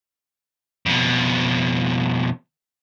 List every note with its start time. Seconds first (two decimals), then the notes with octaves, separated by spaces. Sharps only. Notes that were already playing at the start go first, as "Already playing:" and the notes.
0.86 F2 B2